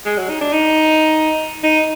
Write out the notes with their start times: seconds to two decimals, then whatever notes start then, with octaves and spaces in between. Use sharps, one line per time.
0.06 G#3
0.18 F#3
0.29 D#4
0.41 D4
0.53 D#4
1.63 D#4